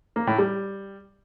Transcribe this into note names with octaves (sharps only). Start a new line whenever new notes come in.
A#3
A2
G3